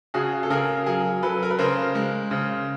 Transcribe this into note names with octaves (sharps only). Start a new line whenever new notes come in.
C#3 F#4 G#4
A4
C#3 G#4 A#4
F#3 G#4 A#4
F#3 A4 B4
A#4
B4
C#3 A#4 C5
G#3
C#3